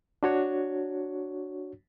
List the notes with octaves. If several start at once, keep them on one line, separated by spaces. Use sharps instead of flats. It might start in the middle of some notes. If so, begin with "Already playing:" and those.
D4 F#4 C#5